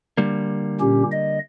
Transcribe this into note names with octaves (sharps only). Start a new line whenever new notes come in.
D3 G3 A#3
A#2 C#4 G4
D#5